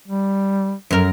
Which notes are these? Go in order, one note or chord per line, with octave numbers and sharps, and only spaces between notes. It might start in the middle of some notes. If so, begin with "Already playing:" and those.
G3
F#2 A#4